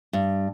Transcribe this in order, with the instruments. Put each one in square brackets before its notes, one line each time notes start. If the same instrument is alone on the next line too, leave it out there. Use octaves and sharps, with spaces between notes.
[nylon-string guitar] G2